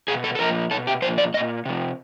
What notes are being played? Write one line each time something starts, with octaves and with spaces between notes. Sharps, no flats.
B2 G#4
A4
A4
A#2 F3 A#4
B2 A4
G4
A#2 F3 C5
D5
F3 D#5
A#2
C3 F3